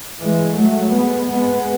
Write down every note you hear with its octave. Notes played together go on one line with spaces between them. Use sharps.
E3 G#3
F#3 A3
G#3 B3
G#3 B3